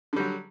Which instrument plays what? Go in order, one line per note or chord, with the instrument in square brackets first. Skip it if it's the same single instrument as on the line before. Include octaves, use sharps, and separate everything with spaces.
[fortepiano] D3
G3
F#3